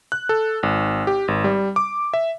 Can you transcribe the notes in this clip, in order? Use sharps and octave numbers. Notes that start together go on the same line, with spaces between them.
F#6
A4
G#1
G4
G#1
G3
D6
E5